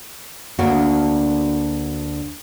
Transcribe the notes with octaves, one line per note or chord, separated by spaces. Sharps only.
D2 A#3 D4 F#4